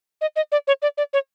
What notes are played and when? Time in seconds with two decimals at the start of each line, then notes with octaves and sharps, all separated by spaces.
0.21 D#5
0.36 D#5
0.52 D5
0.67 C#5
0.82 D5
0.98 D5
1.13 C#5